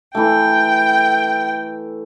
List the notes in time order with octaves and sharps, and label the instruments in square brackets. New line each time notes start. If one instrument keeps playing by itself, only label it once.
[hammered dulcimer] E3 A3 [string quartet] G5